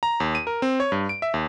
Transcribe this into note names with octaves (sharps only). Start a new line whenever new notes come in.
A#5
D#2
D#7
A#4
C4
C#5
G2
D7
E5
D#2